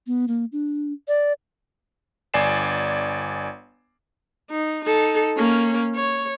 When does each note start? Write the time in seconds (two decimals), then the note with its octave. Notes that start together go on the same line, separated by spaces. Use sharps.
0.07 B3
0.28 A#3
0.52 D4
1.08 D5
2.34 G1 D5 G#5 C7 E7
4.50 D#4
4.85 D#4 A4
5.37 A#3 C#4
5.95 C#5